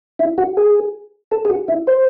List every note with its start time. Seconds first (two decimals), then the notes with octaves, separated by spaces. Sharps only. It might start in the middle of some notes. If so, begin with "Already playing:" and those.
0.19 E4
0.38 F#4
0.57 G#4
1.31 A4
1.45 G#4
1.50 F#4
1.68 E4
1.87 C5